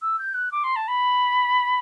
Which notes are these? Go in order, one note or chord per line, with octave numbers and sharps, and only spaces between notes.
E6
G6
F#6
D6
C6
A5
B5